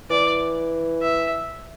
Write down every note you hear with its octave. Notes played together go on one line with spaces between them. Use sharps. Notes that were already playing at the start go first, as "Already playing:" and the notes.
E3 D5
E5